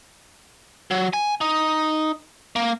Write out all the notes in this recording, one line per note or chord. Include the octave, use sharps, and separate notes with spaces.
F#3
G#5
D#4
A#3